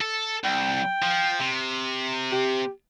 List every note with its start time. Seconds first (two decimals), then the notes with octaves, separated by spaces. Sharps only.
0.01 A4
0.44 C2 G5
1.03 F3
1.40 C3
2.32 G4